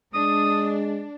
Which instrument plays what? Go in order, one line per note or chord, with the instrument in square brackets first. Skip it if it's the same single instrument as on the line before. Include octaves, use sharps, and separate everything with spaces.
[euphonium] G#3 [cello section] D4 [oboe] D#6